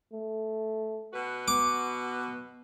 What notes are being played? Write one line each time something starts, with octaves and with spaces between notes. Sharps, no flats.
A3
B2 F#4 B4
B3 D6